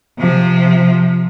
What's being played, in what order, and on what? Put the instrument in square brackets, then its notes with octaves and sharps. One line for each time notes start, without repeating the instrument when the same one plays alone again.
[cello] C3 F3